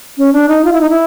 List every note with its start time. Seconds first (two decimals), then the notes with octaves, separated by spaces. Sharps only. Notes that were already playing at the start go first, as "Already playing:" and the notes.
0.18 C#4
0.33 D4
0.49 D#4
0.65 F4
0.73 E4
0.81 D#4
0.90 E4